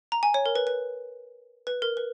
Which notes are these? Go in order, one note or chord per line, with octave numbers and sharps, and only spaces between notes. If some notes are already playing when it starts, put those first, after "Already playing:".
A#5
G#5
C#5
A#4
B4
B4
B4
A#4
B4